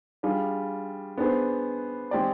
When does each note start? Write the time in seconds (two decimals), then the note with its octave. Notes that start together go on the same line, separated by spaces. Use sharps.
0.23 G3 D4 F4 G#4
1.17 B3 D4 G#4 C5
2.11 G#3 C4 G4 D5